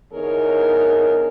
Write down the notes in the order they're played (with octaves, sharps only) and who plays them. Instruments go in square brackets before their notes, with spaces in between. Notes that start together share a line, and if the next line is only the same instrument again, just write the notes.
[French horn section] E2 D3 D#4 G#4 A#4 C#5